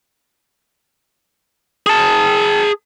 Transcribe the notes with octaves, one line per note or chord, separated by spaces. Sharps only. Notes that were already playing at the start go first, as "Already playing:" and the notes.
G#4 A5